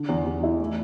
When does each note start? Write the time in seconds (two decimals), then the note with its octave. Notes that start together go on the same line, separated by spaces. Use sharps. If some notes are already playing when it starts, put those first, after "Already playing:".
Already playing: D3 D4
0.09 E2
0.26 E2
0.43 E4
0.60 A3